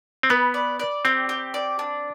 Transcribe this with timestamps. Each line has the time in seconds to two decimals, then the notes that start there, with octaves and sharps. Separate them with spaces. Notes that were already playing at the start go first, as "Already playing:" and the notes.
0.23 C4
0.30 B3 B4
0.54 D5
0.80 D5
1.05 C4 G4
1.29 G4
1.54 D5
1.79 D4